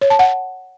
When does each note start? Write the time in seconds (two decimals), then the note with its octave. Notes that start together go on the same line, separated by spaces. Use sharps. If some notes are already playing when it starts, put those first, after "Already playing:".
0.01 C#5
0.10 A5
0.19 F#5